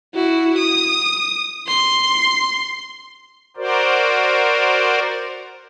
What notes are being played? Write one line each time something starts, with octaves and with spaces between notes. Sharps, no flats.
E4 F#4
D#6
C6
F#4 A#4 C5 D5